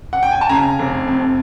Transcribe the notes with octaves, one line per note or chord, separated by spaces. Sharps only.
F#5
G5
G#5
A5
C#3 G#5 A#5
F1
F2